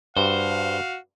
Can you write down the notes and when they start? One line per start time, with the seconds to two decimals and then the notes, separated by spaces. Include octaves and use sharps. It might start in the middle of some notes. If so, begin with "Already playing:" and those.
0.17 G2 F#4 C5 F5